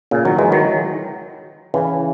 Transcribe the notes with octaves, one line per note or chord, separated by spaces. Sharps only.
A#2 C#3
D#3 F#3
E3 G#3
D#3 F#3
C#3 E3